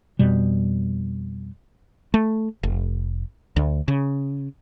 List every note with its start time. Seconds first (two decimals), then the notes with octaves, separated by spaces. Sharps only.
0.19 F2 B2 G3
2.14 A3
2.63 F1
3.56 D2
3.88 C#3